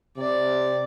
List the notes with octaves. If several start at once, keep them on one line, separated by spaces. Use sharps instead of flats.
C3 D5